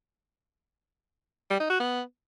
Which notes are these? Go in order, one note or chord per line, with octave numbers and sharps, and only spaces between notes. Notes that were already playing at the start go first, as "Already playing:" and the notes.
G3
D#4
F#4
B3